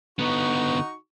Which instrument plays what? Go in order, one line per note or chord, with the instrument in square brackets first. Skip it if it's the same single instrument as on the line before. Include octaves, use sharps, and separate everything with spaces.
[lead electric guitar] D3 B3 [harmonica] D#4 F#4 C#6